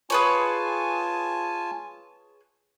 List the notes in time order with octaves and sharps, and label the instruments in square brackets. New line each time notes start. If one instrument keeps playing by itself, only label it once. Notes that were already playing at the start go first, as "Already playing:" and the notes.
[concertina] F4 G#5 A5 [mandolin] G#4 B4 C#5